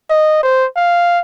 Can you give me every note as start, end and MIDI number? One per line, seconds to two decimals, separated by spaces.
0.10 0.39 75
0.43 0.66 72
0.76 1.21 77